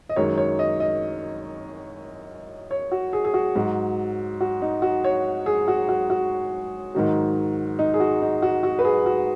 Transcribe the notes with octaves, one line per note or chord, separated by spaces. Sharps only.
D#5
F#2 D#3 G#3 C#5
C#5
D#5
D#5
C#5
F#4
G#4
G#4
F#4
G#2 F#3
F#4
D#4
F#4
C#5
G#4
F#4
F#4
F#4
G#2 D#3 F#3
D#4
G#4
F#4
D#4
F#4
F#4
B4
G#4
F#4